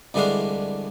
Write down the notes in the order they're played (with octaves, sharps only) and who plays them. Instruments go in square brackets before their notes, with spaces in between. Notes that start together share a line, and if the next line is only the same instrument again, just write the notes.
[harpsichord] C2 D3 E3 G#3 D4 F5